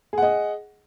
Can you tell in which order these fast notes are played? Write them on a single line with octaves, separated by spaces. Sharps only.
G#4 F#5 D#5